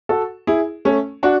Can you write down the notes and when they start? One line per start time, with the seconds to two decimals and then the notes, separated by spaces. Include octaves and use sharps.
0.09 F#4 A4
0.47 E4 G#4
0.85 A3 C#4
1.23 D4 F#4